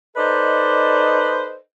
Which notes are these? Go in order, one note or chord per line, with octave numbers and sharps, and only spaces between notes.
D#4 A4 B4 C5 D5 D#5